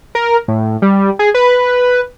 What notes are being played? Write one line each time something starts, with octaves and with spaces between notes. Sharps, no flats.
A#4
A2
G3
G#4
B4